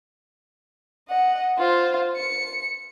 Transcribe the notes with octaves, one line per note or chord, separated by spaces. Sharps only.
D#5 F#5
F4 C5
C#7